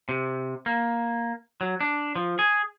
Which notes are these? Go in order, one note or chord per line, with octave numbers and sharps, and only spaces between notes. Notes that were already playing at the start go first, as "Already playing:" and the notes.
C3
A#3
F#3
D4
F3
G#4